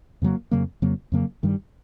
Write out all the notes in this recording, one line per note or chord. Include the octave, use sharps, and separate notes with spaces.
F2 C#3 F#3 A#3
F2 C#3 F#3 A#3
F2 C#3 F#3 A#3
F2 C#3 F#3 A#3
G2 D#3 G3